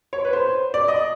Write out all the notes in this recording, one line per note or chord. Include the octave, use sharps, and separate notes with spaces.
C#5
B4
C5
D5
D#5